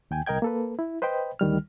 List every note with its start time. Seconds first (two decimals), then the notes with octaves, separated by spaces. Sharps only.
0.11 D#2 G5 G#5
0.26 C2 A#4 D#5 G5 G#6
0.42 A#3 A4 B4
0.79 E4
1.02 B4 C5 D#5 G5 B5
1.39 D2 D#3 G3 F6